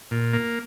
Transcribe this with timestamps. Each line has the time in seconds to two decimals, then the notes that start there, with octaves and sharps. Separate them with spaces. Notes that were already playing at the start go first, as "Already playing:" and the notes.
0.11 A#2
0.33 A#3